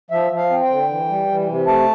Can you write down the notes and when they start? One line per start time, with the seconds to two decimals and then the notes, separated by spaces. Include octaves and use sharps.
0.11 F3 E5
0.31 F3
0.37 F5
0.50 C4
0.63 G5
0.69 D3
0.89 E3
1.09 G3
1.28 E3
1.47 C3
1.66 A3 A5